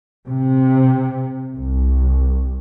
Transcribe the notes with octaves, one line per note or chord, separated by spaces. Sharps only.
C3
C2